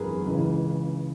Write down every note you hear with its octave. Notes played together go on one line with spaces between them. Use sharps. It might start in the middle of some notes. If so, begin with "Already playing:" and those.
Already playing: G#1 F#2 E3 G#4 A#4 B4
C#2 C#3 E3